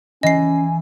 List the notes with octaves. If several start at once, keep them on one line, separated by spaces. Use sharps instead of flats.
E3 C#4 D#5 G#5 C7